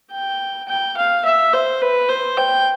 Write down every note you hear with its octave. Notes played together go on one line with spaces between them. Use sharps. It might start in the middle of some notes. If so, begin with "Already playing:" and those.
G5
G5
F5
E5
C5
B4
C5
G5